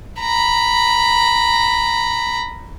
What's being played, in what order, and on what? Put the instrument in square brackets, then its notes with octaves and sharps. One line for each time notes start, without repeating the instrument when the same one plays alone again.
[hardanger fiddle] A#5 B5